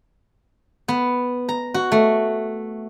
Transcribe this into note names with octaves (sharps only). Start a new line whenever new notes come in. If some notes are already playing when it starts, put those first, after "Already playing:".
B3
A#5
F#4
A3